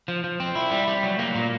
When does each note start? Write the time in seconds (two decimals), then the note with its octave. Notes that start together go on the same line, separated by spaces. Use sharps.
0.08 F3
0.24 F3
0.40 C4
0.55 E4
0.71 G3
0.87 G3
1.03 F#3
1.19 A#3
1.35 A#2